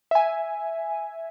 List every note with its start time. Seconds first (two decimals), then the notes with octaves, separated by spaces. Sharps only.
0.11 E5 G#5